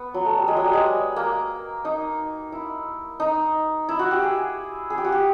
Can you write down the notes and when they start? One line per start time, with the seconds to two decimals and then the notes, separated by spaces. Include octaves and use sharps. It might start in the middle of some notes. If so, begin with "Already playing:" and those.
Already playing: B3
0.14 F#3
0.25 A3
0.37 G3
0.48 G#3
0.56 F#3
0.65 G3
0.73 G#3
1.16 A#3
1.85 D#4
2.52 E4
3.20 D#4
3.89 E4
3.99 F#4
4.11 G4
4.23 G#4
4.90 G#4
4.98 G4
5.04 F#4
5.12 G4